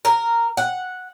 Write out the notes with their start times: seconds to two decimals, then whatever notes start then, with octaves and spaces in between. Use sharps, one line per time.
0.05 A#4
0.57 F#5